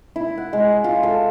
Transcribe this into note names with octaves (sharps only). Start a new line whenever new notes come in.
E4
F#5
G#3
F4
A4